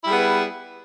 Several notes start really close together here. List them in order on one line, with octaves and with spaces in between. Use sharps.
E4 G3 G#4 B3 B4